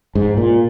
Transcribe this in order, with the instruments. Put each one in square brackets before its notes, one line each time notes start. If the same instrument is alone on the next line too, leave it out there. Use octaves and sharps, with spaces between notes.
[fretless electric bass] G#2
A#2